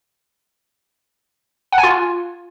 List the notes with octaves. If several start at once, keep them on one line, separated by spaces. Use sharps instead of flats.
F#5
G#5
F4